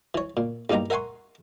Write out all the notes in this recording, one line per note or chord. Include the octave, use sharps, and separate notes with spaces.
E3 C#5
A#2
E2 G2 A#3 D#4 G4 A#5
A#4 E5 F#5 G#5 C6 C#6